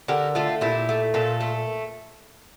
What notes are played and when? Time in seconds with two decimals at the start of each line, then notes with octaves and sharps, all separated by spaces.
0.08 D3 G4 A#4
0.35 A3 F4 A4
0.61 A#2 E4 G4
0.89 A3
1.14 A#2 F4 A4
1.41 A3